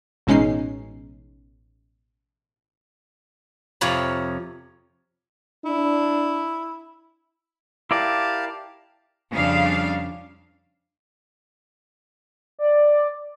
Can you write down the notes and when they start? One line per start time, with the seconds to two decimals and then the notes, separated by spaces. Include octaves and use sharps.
0.27 A1 B2 G#3 C#4 D#4 C7
3.81 F2 C3 F3 C#5 A#5 B5
5.65 D4 E4
7.91 E4 G4 A#4 D5 F5 A5
9.31 F2 C#3 G3 D4 F5
12.59 D5